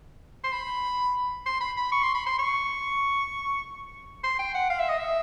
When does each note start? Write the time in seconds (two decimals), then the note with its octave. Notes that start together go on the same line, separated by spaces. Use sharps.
0.44 C6
0.52 B5
1.46 C6
1.61 B5
1.77 B5
1.92 C#6
2.03 C6
2.14 B5
2.26 C6
2.39 C#6
4.24 C6
4.39 G5
4.54 F#5
4.70 F5
4.79 E5
4.89 D#5
4.98 E5